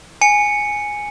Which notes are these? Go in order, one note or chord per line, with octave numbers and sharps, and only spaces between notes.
G#5 C#7